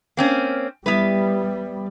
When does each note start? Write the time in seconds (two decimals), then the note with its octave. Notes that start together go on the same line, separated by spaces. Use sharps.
0.17 A#3 C4 C#4
0.86 G3 B3 E4 B4